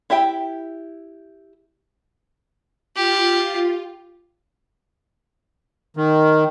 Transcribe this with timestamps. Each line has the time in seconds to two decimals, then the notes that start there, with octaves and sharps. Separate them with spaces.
0.10 E4 G4 E5 G5
2.96 F4 G4
5.97 D#3